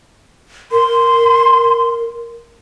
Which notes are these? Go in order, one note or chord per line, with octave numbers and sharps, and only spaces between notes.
A#4 C6